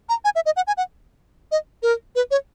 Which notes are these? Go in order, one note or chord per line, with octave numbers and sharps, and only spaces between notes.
A#5
G#5
E5
D#5
F#5
G#5
F#5
D#5
A#4
B4
C#5